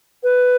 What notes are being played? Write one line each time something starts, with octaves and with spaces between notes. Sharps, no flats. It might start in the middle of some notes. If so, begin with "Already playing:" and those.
B4